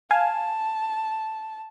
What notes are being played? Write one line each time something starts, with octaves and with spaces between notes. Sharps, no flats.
F5 G#5 A5